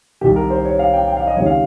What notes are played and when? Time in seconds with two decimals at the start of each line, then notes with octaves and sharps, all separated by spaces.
0.21 C2 C3 D#3 G4
0.36 A#4
0.50 C5
0.65 C#5
0.79 F5
0.93 G5
1.08 G5
1.17 F5
1.27 D#5
1.36 C#2 C3 D#3 C#5
1.46 F5